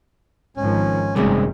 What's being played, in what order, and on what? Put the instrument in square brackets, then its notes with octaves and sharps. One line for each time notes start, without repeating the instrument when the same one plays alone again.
[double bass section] G#1 D#3 F3 [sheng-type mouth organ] C#4
[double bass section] F#1 F#2 [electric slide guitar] C3 D#3 G3 [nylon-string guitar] G#3 C4 C#4